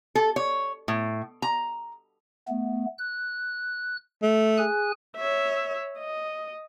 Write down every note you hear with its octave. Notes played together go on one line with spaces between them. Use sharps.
A4
C#5
A2
A#5
A3 B3
F#6
A3
G#4 G#5 F#6
C#5 E5
D#5